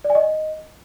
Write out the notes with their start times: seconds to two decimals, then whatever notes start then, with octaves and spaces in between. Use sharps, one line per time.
0.04 D5
0.10 G#5
0.15 D#5